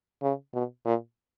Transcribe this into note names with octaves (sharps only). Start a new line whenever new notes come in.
C#3
B2
A#2